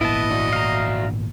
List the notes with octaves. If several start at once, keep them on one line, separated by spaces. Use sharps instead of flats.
G#1 A#2 B3 E4 D#5 A5
D4 F#4
F5 A#5